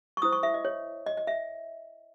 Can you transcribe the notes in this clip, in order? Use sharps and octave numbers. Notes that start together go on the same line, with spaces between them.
C#6
E4 C5 D#6
C#6
E5
D#5
C#5
D#5
D#5
E5